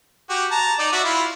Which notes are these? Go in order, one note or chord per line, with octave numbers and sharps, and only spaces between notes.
F#4 G4
A5 A#5
D#4 D5
F#4 D5 E5
E4 F4